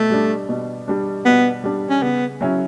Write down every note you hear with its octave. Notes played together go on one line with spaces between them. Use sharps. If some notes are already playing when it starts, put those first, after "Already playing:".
Already playing: B2 A3
G3 D4
B2
G3 D4
B2 B3
G3 D4
C#4
C#3 B3
F#3 C#4 E4